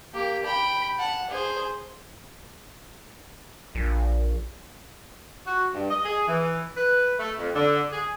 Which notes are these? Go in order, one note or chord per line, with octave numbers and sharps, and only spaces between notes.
A#3 G4
G5 B5
F#5 A5
G#4 C5
A#1
F#4
G2
D#5
G#4
E3
B4
A3
F2
D3
G#4